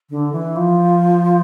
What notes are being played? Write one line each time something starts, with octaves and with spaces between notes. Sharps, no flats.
D3
E3
F3